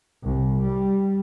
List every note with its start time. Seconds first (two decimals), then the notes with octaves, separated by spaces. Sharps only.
0.23 C2
0.62 G3